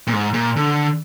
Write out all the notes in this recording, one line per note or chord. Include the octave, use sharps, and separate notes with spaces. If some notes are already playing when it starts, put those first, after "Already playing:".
A#2
G#2
A#2
D3